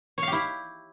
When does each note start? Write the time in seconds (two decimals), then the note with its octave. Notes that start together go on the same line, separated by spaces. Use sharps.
0.18 C#5
0.23 F5
0.27 G4
0.32 E4